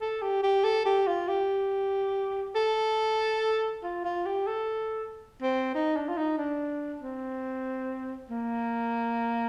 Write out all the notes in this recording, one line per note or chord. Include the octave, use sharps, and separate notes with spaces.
A4
G4
G4
A4
G4
F4
G4
A4
F4
F4
G4
A4
C4
D#4
D4
F4
D#4
D4
C4
A#3